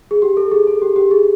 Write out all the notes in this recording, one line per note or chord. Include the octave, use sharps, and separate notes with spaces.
G#4
G4
A4
G#4
A4
G4
G4
G#4